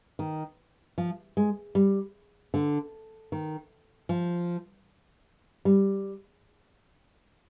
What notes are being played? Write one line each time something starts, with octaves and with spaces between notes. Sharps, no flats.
D#3
F3
G#3
G3
D3
D#3
F3
G3